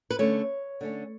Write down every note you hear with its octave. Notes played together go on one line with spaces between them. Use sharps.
B4
D3 A3 C#4 C#5
D3 A3 C#4